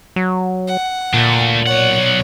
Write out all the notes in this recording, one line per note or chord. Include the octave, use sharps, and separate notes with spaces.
F#3
F#5
A#2 A3 D4
B1 C#5 D5 F#5